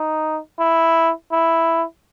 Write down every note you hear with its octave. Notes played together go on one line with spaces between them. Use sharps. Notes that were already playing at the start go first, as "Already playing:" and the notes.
Already playing: D#4
E4
E4